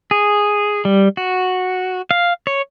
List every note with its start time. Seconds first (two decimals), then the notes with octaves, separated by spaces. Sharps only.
0.11 G#4
0.85 G3
1.17 F#4
2.11 F5
2.47 C#5